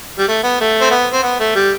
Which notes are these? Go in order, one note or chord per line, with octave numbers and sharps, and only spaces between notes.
G3
A3
B3
A3
C4
B3
C4
B3
A3
G3